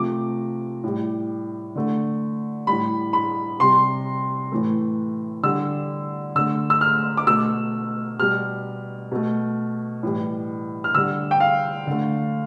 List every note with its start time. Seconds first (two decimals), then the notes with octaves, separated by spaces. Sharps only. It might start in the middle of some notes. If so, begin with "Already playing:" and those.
Already playing: C3 F3 A3 D6
0.83 A2 G3
1.75 D3 A3
2.67 A2 G3 B5
3.13 B5
3.60 C3 G3 C6
4.52 A2 E3 A3
5.43 D3 G3 E6
6.35 D3 A3 E6
6.70 E6
6.81 F6
7.17 D6
7.27 B2 A3 E6
8.19 B2 G3 F6
9.11 B2 A3
10.03 A2 E3 G3
10.84 F6
10.95 D3 G3 E6
11.31 G5
11.40 F5
11.87 D3 A3